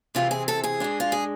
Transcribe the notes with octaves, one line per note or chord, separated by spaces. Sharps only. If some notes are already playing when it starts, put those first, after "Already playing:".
C3 E3 G#3 C4 F4
G#4
A4
G#4
G#2 G#3 D4
F4
G#4